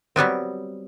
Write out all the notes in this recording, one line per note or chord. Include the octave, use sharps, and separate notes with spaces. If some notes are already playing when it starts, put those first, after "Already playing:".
F#3 G3 B3 C4